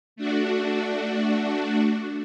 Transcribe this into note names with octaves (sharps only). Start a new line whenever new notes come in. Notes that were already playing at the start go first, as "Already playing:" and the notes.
A3 D4 F#4